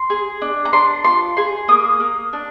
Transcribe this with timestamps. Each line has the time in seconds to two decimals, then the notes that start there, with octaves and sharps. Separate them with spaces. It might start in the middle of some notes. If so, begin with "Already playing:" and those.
Already playing: C6
0.10 G#4
0.42 D4
0.65 A#5
0.73 D4 C6
1.04 F4 C6
1.37 G#4 C6
1.68 A#3 D#6
2.00 A#3
2.33 D4